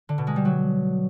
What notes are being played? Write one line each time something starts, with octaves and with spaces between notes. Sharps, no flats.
D3
B2
G#3
G3
F#3